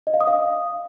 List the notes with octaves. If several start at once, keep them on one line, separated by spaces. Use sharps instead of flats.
D#5
F5
D#6
F5